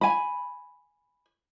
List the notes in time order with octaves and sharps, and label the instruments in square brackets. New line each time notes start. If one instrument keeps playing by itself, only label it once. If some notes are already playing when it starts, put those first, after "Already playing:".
[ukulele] G#5 B5